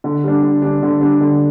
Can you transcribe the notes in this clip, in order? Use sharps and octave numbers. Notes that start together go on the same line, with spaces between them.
D3
G3 D4
D3
G3 D4
D3
G3 D4
D3